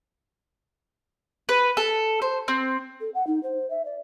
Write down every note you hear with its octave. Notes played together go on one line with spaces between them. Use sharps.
B4
A4
C5
C4
A4
F#5
D#4
C5
E5
D5